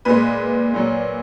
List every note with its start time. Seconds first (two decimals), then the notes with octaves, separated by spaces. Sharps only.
0.05 A#2 G#3 B4
0.74 A#2 F#3